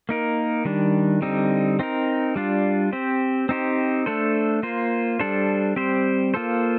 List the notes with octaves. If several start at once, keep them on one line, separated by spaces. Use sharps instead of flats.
A#3 D#4 A#4
D#3 G3 D4
D3 G3 C4 D#4
C4 D#4 A#4
G3 D4 F4
C4 G4 C5
C4 D#4 G4 C5
A3 D4 A4 C5
A#3 F4 C5
G3 D4 A4 C5
G3 C4 G4 C5
A#3 F4 A4 C5